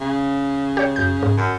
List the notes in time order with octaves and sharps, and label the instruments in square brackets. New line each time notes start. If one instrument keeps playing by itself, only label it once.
[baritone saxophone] C#3
[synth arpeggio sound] G4 C#5
F#2 G6
G#2
[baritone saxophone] F#2